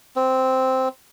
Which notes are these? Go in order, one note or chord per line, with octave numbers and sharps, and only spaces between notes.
C4